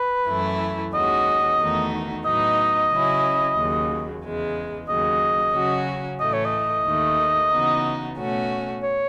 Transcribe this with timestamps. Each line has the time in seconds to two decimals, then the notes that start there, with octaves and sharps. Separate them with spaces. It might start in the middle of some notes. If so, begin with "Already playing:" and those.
Already playing: B4
0.28 F#2 E3 A3 E4
0.94 D#2 D#3 G#3 C#4 F#4 D#5
1.60 E2 D#3 A3 D#4 F#4
2.25 A2 F#3 B3 D#4 D#5
2.91 C#3 F#3 C#4 E4
3.57 D#2 C#3 F#3
4.23 E2 C#3 G#3
4.88 D#2 C#3 F#3 D#5
5.54 C#3 F#3 C#4 F#4
6.20 A2 E3 A3 D#5
6.33 C#5
6.45 D#5
6.86 D#2 D#3 A3
7.52 C#3 E3 B3 D#4 F#4
8.17 B2 A3 C#4 F#4
8.83 C#5